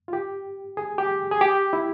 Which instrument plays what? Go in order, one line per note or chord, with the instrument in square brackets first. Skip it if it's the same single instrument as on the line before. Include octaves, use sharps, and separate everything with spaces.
[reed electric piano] F4
G4
G#4
G4
G#4
G4
E4